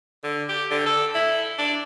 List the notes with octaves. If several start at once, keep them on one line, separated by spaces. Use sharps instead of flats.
D3
G4
D3
A4
E4
D4